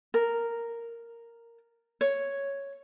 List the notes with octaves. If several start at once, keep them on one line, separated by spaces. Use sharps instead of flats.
A#4
C#5